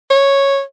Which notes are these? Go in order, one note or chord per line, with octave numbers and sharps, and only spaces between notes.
C#5